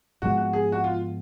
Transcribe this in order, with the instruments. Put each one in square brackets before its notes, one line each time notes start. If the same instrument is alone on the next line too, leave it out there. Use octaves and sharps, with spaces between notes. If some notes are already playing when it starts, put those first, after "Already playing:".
[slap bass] G#2 F3 G#3 B3 [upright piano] F#4
[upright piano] F#4
G#4
F#4
F4